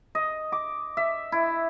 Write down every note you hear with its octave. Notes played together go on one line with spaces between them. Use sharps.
D#5
D6
E5
E4